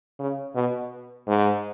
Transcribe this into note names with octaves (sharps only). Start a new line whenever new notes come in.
C#3
B2
G#2